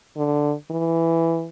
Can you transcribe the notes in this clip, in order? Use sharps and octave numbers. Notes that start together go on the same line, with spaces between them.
D3
E3